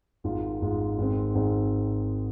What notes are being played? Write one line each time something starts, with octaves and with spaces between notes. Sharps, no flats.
G#1 G#2 G#3 F4
G#1 G#2 G#3 F4
G#1 G#2 G#3 C4
G#1 G#2 G#3 C4